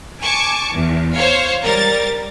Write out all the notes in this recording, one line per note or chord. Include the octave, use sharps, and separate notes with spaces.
G#5 A5 C#6 D6
E2
C5 C#5 F5
G3 A#4 A6